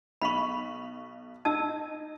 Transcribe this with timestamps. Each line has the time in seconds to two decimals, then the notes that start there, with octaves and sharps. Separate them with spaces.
0.22 B1 B5 C#6 B6 F#7
1.45 D#4 A5 E6 G#6